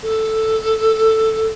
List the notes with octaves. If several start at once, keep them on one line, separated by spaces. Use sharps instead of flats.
A4